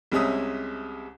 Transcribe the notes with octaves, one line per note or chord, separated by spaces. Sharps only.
C2 C3 G#3 C#4 E5 D#6